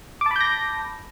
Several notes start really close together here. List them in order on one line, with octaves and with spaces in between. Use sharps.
D6 A5 B5 G6 A#6